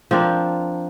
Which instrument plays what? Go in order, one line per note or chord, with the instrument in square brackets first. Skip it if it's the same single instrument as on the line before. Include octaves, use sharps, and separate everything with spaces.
[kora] F3 C4 D4 A#4